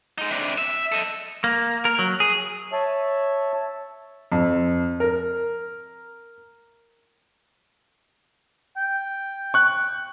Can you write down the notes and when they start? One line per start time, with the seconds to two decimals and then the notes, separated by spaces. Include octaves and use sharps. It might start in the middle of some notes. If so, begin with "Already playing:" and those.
0.18 G#3 D#4
0.30 C3 D4
0.58 E5
0.92 A4 D#5
1.44 A#3
1.85 A#4
1.99 F#3
2.20 G#4
2.72 C#5 E5 A5
4.32 F2
5.00 A#4
8.77 G5
9.54 C#6 F#6